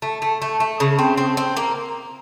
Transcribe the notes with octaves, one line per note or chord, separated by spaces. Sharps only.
A3
A3
A3
A3
C#3
C4
C4
C4
A#3